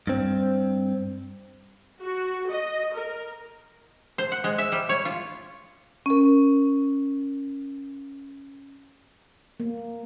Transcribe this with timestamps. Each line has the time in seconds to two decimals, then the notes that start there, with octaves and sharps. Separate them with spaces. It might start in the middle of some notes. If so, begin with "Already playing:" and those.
0.07 G2 C4
2.01 F#4
2.49 D#5
2.95 A#4
4.18 C5
4.32 F#5
4.44 G#3
4.58 E5
4.72 G3
4.89 C#5
5.05 F4
6.06 C#4 A#4
9.60 A#3